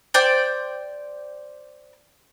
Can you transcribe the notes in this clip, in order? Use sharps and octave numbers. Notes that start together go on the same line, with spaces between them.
C5 D5 G5